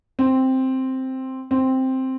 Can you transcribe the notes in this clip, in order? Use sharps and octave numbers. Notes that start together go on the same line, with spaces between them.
C4
C4